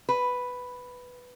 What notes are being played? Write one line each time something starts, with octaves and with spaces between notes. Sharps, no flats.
B4